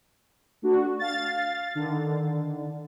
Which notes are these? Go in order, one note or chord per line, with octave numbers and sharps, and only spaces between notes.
A3 D4 F#4
F5 A6
D3 D#3